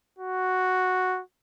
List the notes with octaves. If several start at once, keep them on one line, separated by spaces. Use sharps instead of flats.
F#4